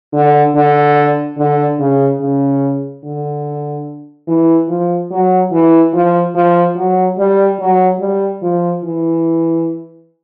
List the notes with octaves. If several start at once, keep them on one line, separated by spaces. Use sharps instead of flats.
D3
D3
D3
C#3
C#3
D3
E3
F3
F#3
E3
F3
F3
F#3
G3
F#3
G3
F3
E3